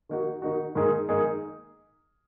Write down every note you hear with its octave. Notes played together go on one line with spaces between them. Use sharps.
D#3 A#3 D#4 F#4
D#3 A#3 D#4 F#4
G#2 D#3 A#3 D#4 G#4
G#2 D#3 A#3 D#4 G#4